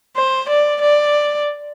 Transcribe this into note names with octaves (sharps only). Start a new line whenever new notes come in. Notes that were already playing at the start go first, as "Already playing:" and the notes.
C5
D5
D5